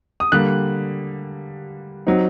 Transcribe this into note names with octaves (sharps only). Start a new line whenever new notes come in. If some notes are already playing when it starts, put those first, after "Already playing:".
D#6
D3 G3 A#3 F#6
F#3 C4 D#4